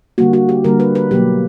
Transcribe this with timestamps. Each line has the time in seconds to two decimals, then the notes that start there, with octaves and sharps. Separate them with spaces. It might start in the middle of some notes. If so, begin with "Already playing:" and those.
0.18 D3 G3 A#3 F#4
0.33 F#4
0.49 G4
0.64 D3 G3 A#3 A#4
0.80 B4
0.95 B4
1.11 B2 F#3 A#3 G4